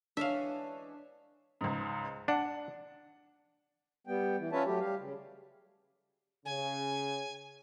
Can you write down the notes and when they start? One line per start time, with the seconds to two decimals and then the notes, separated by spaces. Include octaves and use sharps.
0.17 E3 G#3 C#4 D4 E5 F5
1.61 C#2 G#2
2.28 D4 F#5
4.07 G3 B3 G5
4.38 E3
4.52 C#4 F4 B4 C#5 E5 A5
4.66 F#3 A3 G4
4.81 G3 G4 F5
4.99 C#3
6.46 C#3 G#5